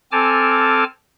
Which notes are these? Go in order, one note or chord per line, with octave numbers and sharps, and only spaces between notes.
C4 A4 G#5 A5 D6 F6